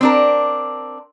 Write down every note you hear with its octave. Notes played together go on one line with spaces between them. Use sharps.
C4 D4 A#4